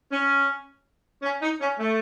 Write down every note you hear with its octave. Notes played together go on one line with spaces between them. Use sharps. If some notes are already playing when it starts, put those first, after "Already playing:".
C#4
C#4
D#4
C#4
A3